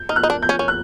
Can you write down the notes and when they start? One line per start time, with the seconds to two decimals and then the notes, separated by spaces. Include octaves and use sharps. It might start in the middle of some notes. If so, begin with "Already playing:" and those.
Already playing: G6
0.09 D#4 F6
0.16 F#6
0.23 D#4
0.30 D4
0.42 G6
0.49 C#4
0.59 C#4
0.68 F#6